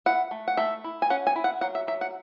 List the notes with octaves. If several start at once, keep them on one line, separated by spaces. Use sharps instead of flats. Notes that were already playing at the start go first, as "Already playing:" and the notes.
E4 F#5
A3
F#5
A3 E5
E4
G#5
C#4 F#5
G#5
E4
F#5
F#3 F#5
E5
F#3 E5
F#5